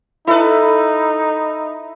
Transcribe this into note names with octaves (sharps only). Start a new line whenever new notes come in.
D#4 E4 A4 B4